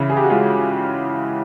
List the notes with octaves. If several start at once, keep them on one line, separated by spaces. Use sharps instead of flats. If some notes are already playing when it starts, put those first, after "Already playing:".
Already playing: C#3 E3 E4
G#4
G4
F#4
G#3 F4